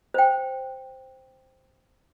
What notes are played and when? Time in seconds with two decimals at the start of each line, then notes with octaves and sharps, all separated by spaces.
0.14 C5 G5